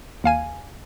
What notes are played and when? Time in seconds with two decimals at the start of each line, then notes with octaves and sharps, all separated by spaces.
0.24 D#2 F5 G#5 D#7